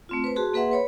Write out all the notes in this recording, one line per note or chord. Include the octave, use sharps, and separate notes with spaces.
A3 C4 F4
B4 C5
F#4 G#4 A5 C6
A#3 G#4 B4 E5 F#5 C6
B4 C#5 B5